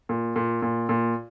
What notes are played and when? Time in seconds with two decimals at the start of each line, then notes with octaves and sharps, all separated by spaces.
0.09 A#2
0.36 A#2
0.62 A#2
0.89 A#2